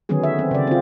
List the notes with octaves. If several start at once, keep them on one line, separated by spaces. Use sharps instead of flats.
D3 D#3 F#3 B3 C#4 G#4
E5
C4
C#3 D5
C4 F4